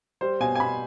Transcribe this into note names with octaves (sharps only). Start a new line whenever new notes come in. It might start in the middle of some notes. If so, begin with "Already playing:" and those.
G3 C5
B2 G#5
G#5
B2 B5